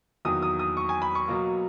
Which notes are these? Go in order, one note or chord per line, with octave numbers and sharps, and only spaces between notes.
E2 D#3 F#3 A#3 D#6
D#6
D#6
C#6
G#5
B5
C#6
B2 F#3 A#3